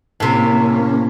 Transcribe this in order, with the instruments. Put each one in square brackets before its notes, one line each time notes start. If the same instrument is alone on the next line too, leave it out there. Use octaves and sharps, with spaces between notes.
[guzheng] A2 C3 [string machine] A#3 C#4